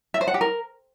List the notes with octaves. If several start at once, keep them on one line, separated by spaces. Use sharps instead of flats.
E5
C5
F#5
G4
A#4